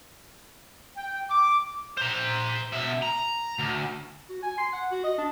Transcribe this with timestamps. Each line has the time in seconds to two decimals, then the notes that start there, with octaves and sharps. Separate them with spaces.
0.97 G5
1.30 D6
1.97 C5 A#5
2.73 B2 E5
3.02 A#5
3.59 D2
4.29 F#4
4.43 G#5
4.58 C6
4.72 F#5
4.91 F#4
5.04 D#5
5.18 D4